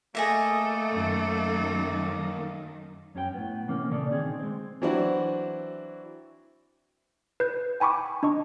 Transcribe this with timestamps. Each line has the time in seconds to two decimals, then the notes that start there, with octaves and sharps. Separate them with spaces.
0.15 A3 A#3 G#4 A4 D#5 E5
0.92 F#2 D#3
3.15 F#2 C#4 G#4 G5
3.34 A2 B3
3.68 C3 E3 A3 A#3 C4 C#4
3.91 A#2 C#3 C#4 A4 D5
4.11 D#3 C4 G#4
4.39 G#3 C4
4.82 E3 F#3 C4 D4 E4 F#4
7.40 B4 G6
7.80 G5 G#5 B5 C#6 D6
8.23 D4 D#5 C#6